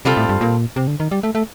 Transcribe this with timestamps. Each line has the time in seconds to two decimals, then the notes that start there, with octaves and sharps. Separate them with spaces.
0.05 C3 G3 C4 F4 A4
0.17 A2
0.29 G2
0.41 A#2
0.76 C3
0.87 D3
1.00 D#3
1.11 G3
1.23 A3
1.35 A3